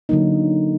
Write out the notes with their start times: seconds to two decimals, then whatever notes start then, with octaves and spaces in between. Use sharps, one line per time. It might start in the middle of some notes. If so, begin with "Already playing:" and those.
0.09 D3 F#3 A#3 D#4